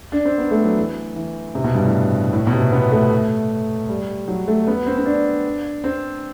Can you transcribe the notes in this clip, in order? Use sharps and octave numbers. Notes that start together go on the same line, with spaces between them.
D4
C4
B3
A3
F#3
E3
E3
C3
B2
G2
A2
A2
B2
C3
B3
A3
G3
F#3
A3
B3
C4
C4
D4
C4